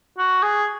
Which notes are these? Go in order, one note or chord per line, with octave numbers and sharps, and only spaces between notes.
F#4
G#4